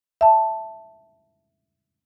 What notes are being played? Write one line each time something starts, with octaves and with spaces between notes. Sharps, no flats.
E5 A5